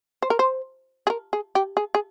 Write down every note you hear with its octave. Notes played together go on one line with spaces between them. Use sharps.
C5
A#4
C5
G#4
A#4
G#4
G4
G#4
G#4